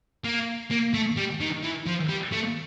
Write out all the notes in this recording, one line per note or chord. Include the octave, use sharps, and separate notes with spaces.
A#3
A#3
A3
G3
D#3
E3
F3
G3
A3